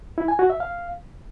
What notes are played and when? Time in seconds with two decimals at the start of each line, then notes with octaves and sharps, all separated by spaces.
0.18 E4
0.28 G#5
0.39 F#4
0.50 E5
0.60 F5